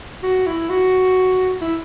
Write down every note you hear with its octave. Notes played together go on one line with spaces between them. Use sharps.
F#4
E4
F#4
E4